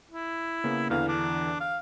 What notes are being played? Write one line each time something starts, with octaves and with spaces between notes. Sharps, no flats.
E4
C#3 A#3 B3
E2 D3 E3 F5
D4
F5